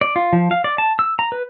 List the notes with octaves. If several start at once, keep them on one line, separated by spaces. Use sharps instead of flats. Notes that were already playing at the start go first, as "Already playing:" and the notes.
D5
F4
F3
F5
D5
A5
E6
A#5
B4